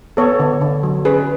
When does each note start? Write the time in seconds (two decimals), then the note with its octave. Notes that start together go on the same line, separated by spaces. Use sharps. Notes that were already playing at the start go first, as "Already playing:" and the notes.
0.17 B3 A4 C#5
0.39 D3
0.61 D3
0.83 F#3
1.05 C#4 G#4 B4